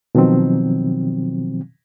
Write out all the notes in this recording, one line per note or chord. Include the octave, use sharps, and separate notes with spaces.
B2 D#3 F3 F#3 C4